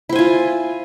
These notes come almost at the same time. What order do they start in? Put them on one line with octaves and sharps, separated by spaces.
E4 C5 G#5 F4